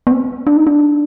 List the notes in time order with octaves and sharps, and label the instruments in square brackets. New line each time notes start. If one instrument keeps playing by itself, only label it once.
[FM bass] B3
C4
D4
D#4
D4